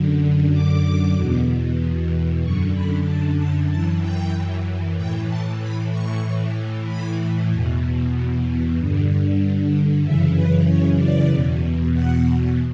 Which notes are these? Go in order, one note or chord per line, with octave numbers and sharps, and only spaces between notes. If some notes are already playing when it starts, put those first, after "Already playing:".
Already playing: F#2 D3
D6
E2 B2
F#2 D3 C#6
B5
A5
A5
F#2 E3 A5
G5
A2 E3 G5
A5
B5
C#6
A2 E3
B5
E2 B2
G2 D3
F#2 C#3 E3 E5
B4
C#5
D5
E2 B2
F#5